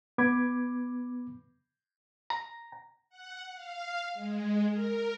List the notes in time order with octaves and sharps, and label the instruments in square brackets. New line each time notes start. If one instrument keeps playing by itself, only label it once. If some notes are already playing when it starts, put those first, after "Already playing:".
[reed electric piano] B3 B5 D6 G#6
[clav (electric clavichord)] A#5
[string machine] F#5
F5
G#3
A#4